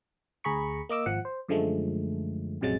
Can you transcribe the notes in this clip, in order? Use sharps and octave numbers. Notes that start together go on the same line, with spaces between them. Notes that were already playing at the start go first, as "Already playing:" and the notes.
D2 G#4 A#5 B5 C#6 C#7
A#3 D#5 D6 E6
G#1 F3 F#5 C#7
C5
F#2 D3 F3 G#3 A3
A#1 F#2 C3 F#3 G#3 A6